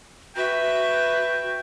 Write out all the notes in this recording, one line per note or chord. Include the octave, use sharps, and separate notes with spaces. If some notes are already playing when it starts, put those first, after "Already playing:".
F#4 B4 E5 G5